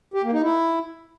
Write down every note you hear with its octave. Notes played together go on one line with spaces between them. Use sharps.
G4
A#3
D#4
E4